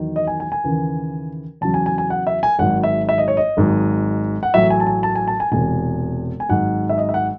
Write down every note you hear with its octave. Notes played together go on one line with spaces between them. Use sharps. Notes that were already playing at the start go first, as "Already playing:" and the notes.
Already playing: E2 D#3 F#3
D#5
G#5
G#5
G#5
D#2 C#3 E3
E2 C#3 F#3 A5
G#5
G#5
G#5
F#5
E5
G#5
G#1 G#2 F#3 F#5
E5
E5
D#5
C#5
D#5
G#1 G#2 F#3
F#5
A1 A2 F#3 E5
G#5
A5
G#5
A5
G#5
A5
G#5
E1 E2 C3 G#5
G#5
G#1 G#2 F#3 F#5
E5
D#5
E5
F#5